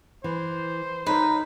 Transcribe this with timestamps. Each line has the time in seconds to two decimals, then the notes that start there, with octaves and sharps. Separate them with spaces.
0.24 E3 C5
1.06 D#4 A#4 B4 C#5 D#5